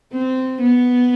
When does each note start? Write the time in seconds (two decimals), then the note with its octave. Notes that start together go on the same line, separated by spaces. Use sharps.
0.12 C4
0.61 B3